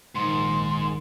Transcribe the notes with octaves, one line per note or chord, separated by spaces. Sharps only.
A#1 G#2 D#3 C6